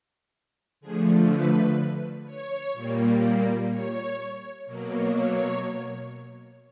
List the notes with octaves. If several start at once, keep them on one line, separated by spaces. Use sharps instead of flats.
D3 F3 A3 G#4
B4
C#5
A#2 G3 A#3
C#5
B2 F#3 A#3
C#5